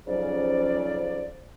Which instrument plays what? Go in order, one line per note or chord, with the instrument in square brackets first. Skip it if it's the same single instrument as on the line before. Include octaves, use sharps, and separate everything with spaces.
[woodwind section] F2 G#2 C#3 F#3 C#4 D5